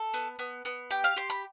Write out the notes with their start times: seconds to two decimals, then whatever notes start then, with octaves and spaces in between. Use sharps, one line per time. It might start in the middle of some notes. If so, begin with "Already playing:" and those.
Already playing: A4
0.14 B3
0.39 B3
0.65 B3
0.90 G4 G5
1.04 F5
1.16 G4 C6
1.30 B5